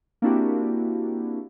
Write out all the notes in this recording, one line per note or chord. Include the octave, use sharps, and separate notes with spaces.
A#3 C4 D4 E4 F#4 G4